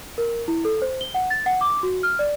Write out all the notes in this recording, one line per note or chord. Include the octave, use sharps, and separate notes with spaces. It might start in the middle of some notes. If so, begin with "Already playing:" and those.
A#4
E4
A4
C5
G7
F#5
A6
F#5
D6
F#4
F6
D5